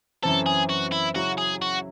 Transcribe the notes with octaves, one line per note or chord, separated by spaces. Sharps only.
F#2 E3 C4 A4
G#4
F#4
E4
C#3 F#3 C#4 E4 F#4
G#4
F#4